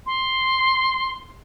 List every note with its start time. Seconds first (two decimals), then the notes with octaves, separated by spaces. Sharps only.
0.06 C6